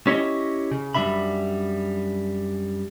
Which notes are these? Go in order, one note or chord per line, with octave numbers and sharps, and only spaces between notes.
C#4 E4 G4 C#5 D#5
C#3
F#2 F#3 G3 D4 E5 B5